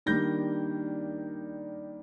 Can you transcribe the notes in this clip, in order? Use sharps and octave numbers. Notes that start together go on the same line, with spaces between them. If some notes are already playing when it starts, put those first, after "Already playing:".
D#3 G3 A#3 D4 G6 A#6